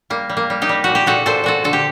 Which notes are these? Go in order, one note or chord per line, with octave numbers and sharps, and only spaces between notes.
G3 A#3
G3
A#3
G3
D#4 G4
G3
A#2 F#4
G4
A#2 F#4 A4
A#2 A4 C5
A#2 F#4 A4
D3 A4
G4